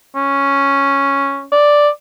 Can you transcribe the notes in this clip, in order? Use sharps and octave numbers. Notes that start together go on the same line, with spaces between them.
C#4
D5